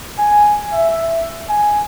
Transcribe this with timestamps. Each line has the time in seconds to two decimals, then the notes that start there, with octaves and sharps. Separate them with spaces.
0.18 G#5
0.72 E5
1.49 G#5